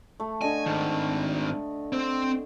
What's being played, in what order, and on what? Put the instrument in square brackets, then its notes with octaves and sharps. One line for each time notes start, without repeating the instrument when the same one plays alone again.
[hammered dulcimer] A3
[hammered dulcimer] D3 A4 D#5 [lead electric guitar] G#5
[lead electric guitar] G#2 D#3 [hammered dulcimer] B5
[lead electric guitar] C4 C5